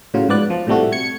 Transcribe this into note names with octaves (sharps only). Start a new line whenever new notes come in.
A2 C#3 F#3 F4
G#2 F3 B3 D5 F#6
F3
A2 C3 G3 A3 F#4
G#6 C#7